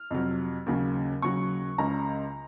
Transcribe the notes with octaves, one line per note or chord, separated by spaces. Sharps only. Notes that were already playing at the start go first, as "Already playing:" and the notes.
Already playing: F6
F2 C3 F#3
D#2 C#3 F#3
D#2 C#3 F#3 C#6
C#2 C#3 G#3 A#5